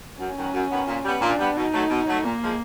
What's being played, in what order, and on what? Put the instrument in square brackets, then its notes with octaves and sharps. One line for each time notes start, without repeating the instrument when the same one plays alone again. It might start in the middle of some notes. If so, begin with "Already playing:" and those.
[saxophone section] F#2 [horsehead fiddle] C#4
[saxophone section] D#3 F#3 B3
F#2
D#3 F#3 B3
A#2
G3 B3
[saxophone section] A#2 [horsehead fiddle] D4
[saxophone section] G3 B3
[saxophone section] B2 [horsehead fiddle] D#4
[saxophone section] F#3 A3
B2
F#3 A3
[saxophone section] A#2 [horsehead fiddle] A#3
[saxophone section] F3 G#3